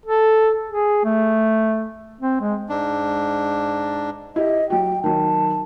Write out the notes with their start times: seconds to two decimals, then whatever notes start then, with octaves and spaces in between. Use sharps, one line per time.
0.06 A4
0.70 G#4
1.05 A3
2.21 C4
2.41 G#3
2.69 G#2 D4
4.36 E4 G4 D#5
4.70 F#3 F#4 G5
5.04 D#3 F#3 A5